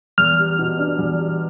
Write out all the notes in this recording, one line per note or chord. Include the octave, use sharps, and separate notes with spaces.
E2 F6
G3
B2
D4
E2
G3